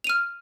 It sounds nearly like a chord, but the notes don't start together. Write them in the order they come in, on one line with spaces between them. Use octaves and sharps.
F7 D#7 F6